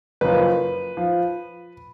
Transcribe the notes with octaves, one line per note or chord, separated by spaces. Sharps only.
F#1 F#2 F3 B4
F3